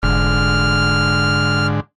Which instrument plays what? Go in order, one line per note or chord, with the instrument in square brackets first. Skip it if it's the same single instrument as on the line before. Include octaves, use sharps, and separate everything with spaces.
[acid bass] F1 [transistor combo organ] G#2 D3 [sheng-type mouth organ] F6